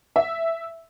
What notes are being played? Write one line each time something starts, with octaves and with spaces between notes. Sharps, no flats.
E5